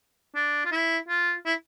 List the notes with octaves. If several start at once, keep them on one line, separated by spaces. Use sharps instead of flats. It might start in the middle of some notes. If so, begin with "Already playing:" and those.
D4
F4
E4
F4
E4